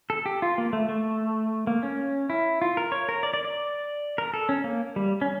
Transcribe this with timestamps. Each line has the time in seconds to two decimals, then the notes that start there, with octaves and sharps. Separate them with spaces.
0.10 A4
0.26 G4
0.42 F4
0.58 A#3
0.73 A3
0.89 A3
1.67 A#3
1.83 C#4
2.30 E4
2.62 F4
2.77 A#4
2.92 C#5
3.09 A#4
3.23 D5
3.34 D5
3.45 D5
4.18 A#4
4.34 A4
4.49 C#4
4.64 A#3
4.96 G3
5.21 C#4